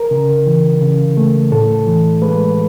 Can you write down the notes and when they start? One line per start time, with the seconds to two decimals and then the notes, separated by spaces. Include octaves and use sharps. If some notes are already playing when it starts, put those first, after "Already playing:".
Already playing: A#4
0.11 C#3
0.46 E3
0.82 C#3
1.17 A3
1.52 A2 A4
1.87 E3
2.22 G#3 B4